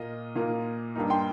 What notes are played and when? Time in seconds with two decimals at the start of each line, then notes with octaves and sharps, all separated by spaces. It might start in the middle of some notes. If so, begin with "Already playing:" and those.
Already playing: A#2 A#3 F4 D#5
0.36 A#2 A#3 F4
0.95 G2 G3 A#3 D#4
1.10 G5 C6